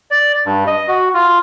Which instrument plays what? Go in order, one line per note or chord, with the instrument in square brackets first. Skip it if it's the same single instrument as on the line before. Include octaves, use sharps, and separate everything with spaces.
[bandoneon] D5
G2
D#5
F#4
F4